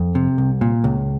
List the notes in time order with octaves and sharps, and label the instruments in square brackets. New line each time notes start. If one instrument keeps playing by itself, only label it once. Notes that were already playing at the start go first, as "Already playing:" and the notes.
Already playing: [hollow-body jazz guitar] F2
C3
C2
A#2
C#2